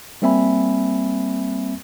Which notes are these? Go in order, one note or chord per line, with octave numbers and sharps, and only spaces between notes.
G3 A#3 C4 E5 G#5 B5